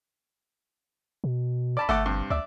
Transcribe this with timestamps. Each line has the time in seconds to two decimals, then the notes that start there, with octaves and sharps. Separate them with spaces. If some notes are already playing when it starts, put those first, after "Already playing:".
1.24 B2
1.77 D5 A5 B5
1.89 G1 A3 F#5 D6
2.06 G2 C3
2.30 D2 D5 E5